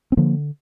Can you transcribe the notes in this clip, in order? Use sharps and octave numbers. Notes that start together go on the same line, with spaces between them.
C4
D3 F3 A#3